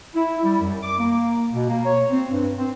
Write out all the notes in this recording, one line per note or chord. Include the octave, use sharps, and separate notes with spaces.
E4
G3
F#2
D6
A#3
B2
A#3
C#5
C4
G2
C4